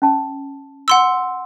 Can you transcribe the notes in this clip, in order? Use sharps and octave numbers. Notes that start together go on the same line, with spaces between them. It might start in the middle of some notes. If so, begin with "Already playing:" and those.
C#4 A5
F#5 C6 E6